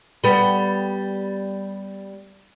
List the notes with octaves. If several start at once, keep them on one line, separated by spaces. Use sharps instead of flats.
G3 B3